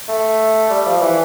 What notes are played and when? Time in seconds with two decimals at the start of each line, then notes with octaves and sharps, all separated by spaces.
0.08 A3
0.70 G3
0.86 F3
1.01 E3